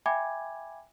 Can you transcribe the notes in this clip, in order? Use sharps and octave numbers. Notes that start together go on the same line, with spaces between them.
E5 G5 G#5 B5 D6 G#6